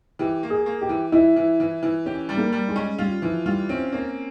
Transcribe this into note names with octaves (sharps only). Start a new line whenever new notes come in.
E3 G4
A#3
G#4
A#3
G4
E3
E3 E4
E3
E3
E3
C#4 G4
G3
A#3
G3
G#3
C#4
G3 F4
E3 F3
G3 F4
C4 C#4
A#3 C#4